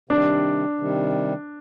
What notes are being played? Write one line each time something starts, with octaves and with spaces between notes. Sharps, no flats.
C3 D#3 G3 D4
C3 D#3 G3